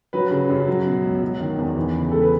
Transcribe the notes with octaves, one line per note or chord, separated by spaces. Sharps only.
F#3 B4
C#3
F#2
F#3
B2
C#2
F#3
D#3
E2
E3
C#3
G#3 A4
B4